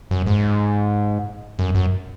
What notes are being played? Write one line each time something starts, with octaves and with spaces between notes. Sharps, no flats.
F#2
G#2
F#2
F#2